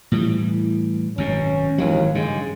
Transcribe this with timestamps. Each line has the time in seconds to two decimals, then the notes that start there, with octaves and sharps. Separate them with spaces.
0.12 A2 E3 G3
1.18 G#1 F#2 B2 C#4
1.78 G#1 D#2 E3 F#3
2.15 G2 C#3 G#3